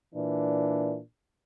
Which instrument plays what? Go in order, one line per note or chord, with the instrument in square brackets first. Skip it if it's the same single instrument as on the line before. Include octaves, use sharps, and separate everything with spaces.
[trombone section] A#2 E3 D4